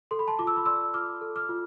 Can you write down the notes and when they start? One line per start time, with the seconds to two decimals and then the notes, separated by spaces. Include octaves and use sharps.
0.11 A4 C6
0.19 B5
0.28 A5 C6
0.39 F4 D6
0.47 E6
0.56 B5 D6
0.66 D5 C6 E6
0.94 F4 D6 F6
1.21 A4
1.36 D6 F6
1.49 F4